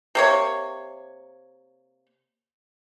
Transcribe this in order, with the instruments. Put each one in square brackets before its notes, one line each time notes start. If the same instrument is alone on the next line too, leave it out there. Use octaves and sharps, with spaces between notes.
[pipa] C3 A#3 C#5